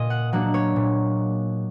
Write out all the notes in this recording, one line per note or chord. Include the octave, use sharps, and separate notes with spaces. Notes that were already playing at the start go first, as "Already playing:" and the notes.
Already playing: A#2 D#5
F#5
F#3 A#3 D4 F#5
C#5
A#2